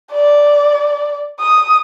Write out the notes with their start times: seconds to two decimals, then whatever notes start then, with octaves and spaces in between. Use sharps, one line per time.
0.12 D5
1.40 D#6